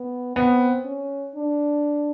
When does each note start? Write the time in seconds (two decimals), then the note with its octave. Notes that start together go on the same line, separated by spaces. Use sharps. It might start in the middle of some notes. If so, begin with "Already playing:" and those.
Already playing: B3
0.36 B3 C4
0.85 C#4
1.35 D4